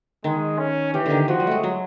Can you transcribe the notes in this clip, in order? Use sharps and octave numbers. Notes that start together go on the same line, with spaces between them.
D#3 G#3
C#4
E3 G4
D3 D#3
F3 F#4
G3
G#3 A3
F#3